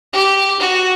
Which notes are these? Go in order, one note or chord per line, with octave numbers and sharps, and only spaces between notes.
G4
F#4